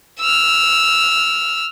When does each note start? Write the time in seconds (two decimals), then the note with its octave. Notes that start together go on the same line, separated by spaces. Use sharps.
0.20 E6 F6